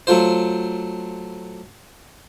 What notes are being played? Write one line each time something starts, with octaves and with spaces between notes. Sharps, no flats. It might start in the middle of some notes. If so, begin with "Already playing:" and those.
F#3 A3 F4 C5